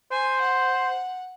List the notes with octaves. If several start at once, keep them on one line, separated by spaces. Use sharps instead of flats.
C5 G#5
F#5